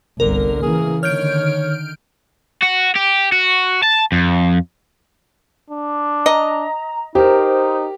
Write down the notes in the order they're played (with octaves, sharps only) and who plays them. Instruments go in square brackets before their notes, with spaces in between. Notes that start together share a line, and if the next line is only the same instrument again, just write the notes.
[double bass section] G1 C2 [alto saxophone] D3 [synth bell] A#4
[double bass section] C#3 E3 A#3 [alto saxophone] G#4
[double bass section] D3 D#3 [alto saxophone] C#5 [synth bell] F6 G6 D7
[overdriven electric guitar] F#4
G4
F#4
A5
F2
[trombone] D4
[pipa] D#5 [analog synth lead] A#5
[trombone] D#4 [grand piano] G4 A#4 [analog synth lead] C5